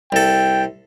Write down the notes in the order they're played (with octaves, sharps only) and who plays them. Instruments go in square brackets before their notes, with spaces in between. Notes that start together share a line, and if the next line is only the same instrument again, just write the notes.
[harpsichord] C2 A4 [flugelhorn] G5